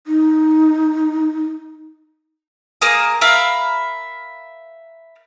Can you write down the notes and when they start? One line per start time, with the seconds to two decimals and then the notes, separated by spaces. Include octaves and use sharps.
0.07 D#4
2.81 A#3 G#4 A#4 D#6
3.21 A#4 E5 F5 B5